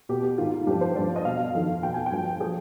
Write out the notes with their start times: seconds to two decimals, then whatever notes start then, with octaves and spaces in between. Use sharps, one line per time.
0.09 B2 G4
0.23 G4
0.38 G#2 D#3 F4
0.67 G2 F3 G4
0.81 C5
0.96 G2 F3 D5
1.16 D#5
1.25 B2 F5
1.54 F2 D#3
1.83 B2 G5
1.94 G#5
2.06 G5
2.12 G2 F3
2.41 F3 G#4